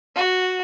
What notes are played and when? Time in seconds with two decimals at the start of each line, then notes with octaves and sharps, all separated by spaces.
0.16 F#4